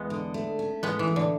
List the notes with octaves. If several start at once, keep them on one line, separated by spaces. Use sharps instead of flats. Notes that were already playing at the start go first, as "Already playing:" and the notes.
Already playing: E2 G#3 B3
D3
A3
C#4
A2 G#3 B3
E3
A3
D3